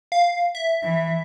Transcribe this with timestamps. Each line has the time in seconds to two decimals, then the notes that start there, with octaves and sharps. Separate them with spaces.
0.12 F5
0.55 E5
0.83 E3